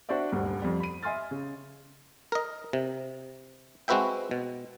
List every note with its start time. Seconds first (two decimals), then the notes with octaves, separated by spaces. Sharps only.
0.09 D4 F#4 C5 D5 E5
0.32 D#1 D2 G2
0.62 F2 G3
0.80 B5 D#7
1.03 D#5 E5 G#5 C6 F6 A6
1.31 C#3
2.32 A#4 D#5
2.73 C3
3.88 G#3 C4 F#4 B4 E5 G5
4.31 B2